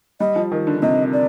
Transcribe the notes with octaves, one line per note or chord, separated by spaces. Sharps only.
G3 D#5
F3
D#3
D3
D3
C3 D#5
D5